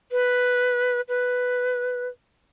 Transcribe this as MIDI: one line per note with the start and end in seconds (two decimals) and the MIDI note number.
0.12 1.01 71
1.09 2.08 71